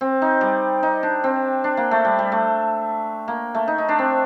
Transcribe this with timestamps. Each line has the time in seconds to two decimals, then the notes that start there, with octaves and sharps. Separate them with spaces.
0.01 C4
0.22 D#4
0.41 G3
0.83 D#4
1.03 D4
1.24 C4
1.64 D4
1.77 A#3
1.91 A3
2.05 G3
2.19 G3
2.32 A3
3.28 A#3
3.55 A3
3.68 D#4
3.78 D#4
3.89 D4
3.99 C4